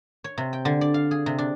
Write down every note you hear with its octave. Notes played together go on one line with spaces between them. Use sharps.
C#5
C3
G5
D3
D5
F5
G#4
C3
D4